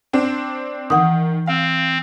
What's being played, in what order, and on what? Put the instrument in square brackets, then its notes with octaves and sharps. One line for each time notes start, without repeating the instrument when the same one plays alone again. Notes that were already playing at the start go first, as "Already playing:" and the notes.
[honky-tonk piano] C4 D4
[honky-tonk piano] D#3 [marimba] E3 F#5 D#6
[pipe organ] C4 [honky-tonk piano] F5